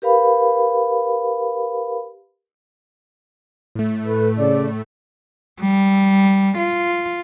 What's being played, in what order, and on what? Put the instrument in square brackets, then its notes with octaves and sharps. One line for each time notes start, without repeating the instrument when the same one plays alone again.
[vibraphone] G4 A#4 B4 F5 B5
[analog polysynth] A2 A3
[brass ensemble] A4 B4
C#3 D5
[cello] G3
F4